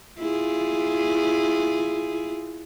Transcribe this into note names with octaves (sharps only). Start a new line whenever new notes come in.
E4 F4 G#4